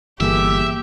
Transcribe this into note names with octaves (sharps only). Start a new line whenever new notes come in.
G1 E3 A#3 G4 G#4 E5